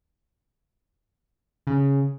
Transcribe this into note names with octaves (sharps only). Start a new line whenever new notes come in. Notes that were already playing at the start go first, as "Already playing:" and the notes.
C#3